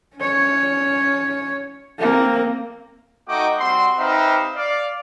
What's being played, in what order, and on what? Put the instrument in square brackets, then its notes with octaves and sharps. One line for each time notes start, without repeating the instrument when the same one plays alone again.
[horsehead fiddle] C#4 C#5
A#3 C4
[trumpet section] A3 D#4 F#4 D#5 G5 D6
G3 C4 F#4 C6
C4 D#4 G4 B4 E5 F5
D5 F5